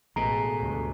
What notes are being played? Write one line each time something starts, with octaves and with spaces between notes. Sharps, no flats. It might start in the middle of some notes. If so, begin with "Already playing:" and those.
A1 B2 G#3 A4 A#5
D2 G2